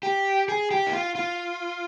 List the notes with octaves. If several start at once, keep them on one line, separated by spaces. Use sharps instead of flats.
G4
G#4
G4
D#4
F4
F4